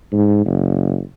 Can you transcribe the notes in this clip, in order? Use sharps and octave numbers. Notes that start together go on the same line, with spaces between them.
G#2
F#1